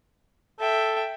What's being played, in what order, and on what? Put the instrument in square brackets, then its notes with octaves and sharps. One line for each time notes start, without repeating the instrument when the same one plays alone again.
[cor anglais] A4 [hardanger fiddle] E5 G5